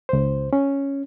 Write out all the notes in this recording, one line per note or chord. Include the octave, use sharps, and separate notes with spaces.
C#2 C5
C#4